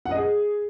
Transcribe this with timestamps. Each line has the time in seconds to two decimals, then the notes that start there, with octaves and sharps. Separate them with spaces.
0.06 F#5
0.11 D#5
0.16 G#4